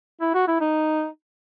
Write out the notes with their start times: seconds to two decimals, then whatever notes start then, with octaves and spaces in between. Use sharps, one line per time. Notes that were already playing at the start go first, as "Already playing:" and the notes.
0.21 E4
0.34 F#4
0.48 E4
0.61 D#4